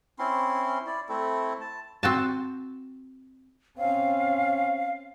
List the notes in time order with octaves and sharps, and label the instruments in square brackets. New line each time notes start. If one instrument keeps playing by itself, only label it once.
[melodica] C4 C#4 E4 C6
E4 D5
A3 C4 E4 A4
A5
[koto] C4 F#4 A5
[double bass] C4 C#4 [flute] F5